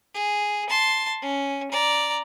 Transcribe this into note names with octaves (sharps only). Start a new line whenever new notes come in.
G#4
A5 C6
C#4
D5 A#5